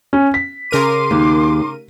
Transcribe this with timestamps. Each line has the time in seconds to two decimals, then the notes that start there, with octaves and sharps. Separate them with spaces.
0.13 C#4
0.34 B6
0.71 C#3 A#4 C6 D6 D#7
1.11 D#2